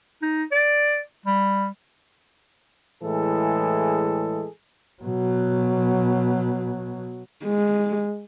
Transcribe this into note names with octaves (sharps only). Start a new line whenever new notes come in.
D#4
D5
G3
A2 E3 G#3 G#4 A4
B2 F#3
G#3